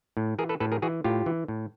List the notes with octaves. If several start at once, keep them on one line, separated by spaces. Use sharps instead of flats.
A2
E3 G#4 A#4
A4 B4
A2 A4 B4
G#4 A#4
E3 F#4 G#4
A2 F4 G4
E3
A2